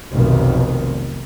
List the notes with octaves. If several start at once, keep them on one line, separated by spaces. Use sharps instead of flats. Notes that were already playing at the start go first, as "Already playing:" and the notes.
F1 B1 D#3